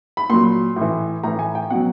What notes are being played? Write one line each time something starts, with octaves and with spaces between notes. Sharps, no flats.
B5
A#2 F#3 C6
A2 E3
A2 E3 A#5
G#5
G5
B2 F#3 F#5